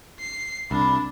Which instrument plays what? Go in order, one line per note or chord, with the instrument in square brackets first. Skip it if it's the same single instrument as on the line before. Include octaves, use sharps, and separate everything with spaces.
[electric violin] C7
[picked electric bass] C2 [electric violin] D4 [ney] B5